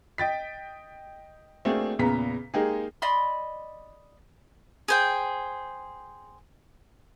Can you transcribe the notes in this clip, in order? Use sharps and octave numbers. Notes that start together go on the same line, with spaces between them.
D#5 G5 A6 B6
A3 A#3 C4 D4 F#4 G#4
E2 A#2 C#3 B3 A#5 B6
G#3 A#3 D#4 G4 G#4
D5 D#5 B5 C6
G#4 C5 G5